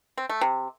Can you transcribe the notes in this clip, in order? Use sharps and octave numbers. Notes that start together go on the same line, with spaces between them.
C4
A3
C3